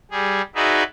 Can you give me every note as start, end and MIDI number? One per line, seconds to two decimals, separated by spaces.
0.11 0.42 55
0.11 0.42 68
0.55 0.83 63
0.55 0.83 66
0.55 0.83 68
0.55 0.83 71
0.55 0.83 74
0.55 0.83 76